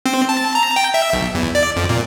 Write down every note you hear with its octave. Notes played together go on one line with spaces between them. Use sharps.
C4
A5
A#5
G5
E5
B1
E2
D5
F2
A#2